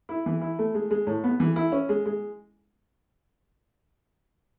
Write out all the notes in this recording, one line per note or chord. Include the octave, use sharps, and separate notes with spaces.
E4
E3
E4
A3
G#3
G#3
A2
B3
E3
E4
C#4
G#3
G#3